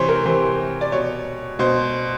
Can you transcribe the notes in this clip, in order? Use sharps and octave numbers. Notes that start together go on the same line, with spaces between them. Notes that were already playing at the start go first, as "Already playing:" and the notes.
Already playing: C3 E3 C5 C#5
A#4
C3 E3 C5
D5
B2 C#5
B2 C5